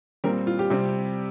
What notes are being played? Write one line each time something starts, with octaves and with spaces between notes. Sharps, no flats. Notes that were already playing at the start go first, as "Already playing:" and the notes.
A#2 G3 C4 A#4
F4
G4
C3 G3 C4